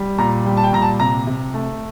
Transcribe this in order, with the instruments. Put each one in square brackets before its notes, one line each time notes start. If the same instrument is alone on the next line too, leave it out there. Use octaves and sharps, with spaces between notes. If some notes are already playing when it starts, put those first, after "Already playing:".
Already playing: [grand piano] G3
A#2 A#5
G3 G5
A5
G5
A#2 A#5
A5
C3 A#5
C3
A3